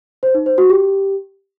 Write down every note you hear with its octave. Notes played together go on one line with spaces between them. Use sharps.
C5
D#4
C5
F#4
G4